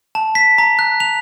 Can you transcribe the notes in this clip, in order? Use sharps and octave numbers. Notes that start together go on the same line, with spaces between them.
A5
B6
A#5
F#6
F7